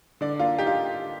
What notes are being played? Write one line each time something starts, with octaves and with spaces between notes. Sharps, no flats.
D3 D5
A#3 F4
D#4 G4
F4